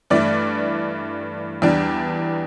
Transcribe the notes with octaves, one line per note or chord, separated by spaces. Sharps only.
G2 E3 A3 D5
E2 E3 G3 D4